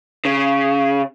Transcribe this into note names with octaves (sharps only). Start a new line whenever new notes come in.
C#3